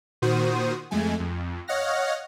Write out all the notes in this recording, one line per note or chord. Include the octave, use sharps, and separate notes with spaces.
A#2 D#3 F#4 C5 D#6
F2 G#3 A3 G#5
F2
C#5 D#5 F5 F#5 F6 A#6